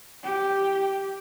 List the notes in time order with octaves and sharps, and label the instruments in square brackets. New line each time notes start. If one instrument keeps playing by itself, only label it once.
[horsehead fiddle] G4